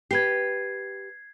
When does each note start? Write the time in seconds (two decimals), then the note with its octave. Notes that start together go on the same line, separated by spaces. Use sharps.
0.11 G4 B4 G#6 C7